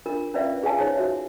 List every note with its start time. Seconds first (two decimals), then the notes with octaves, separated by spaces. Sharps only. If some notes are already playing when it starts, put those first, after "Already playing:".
0.06 D4 F4 A#4
0.34 C#4 F4 B4 D5 E5 F5
0.62 F4 G#4 B4 F5 G#5 A5
0.79 D#4 C5 C#5
0.97 F#4 C5 E5